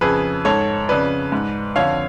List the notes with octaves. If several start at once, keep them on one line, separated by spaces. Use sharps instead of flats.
F2 C#3 G#4 B4
G#2 A4 C#5
F2 C#3 B4 D5
G#2
F2 D3 C#5 F5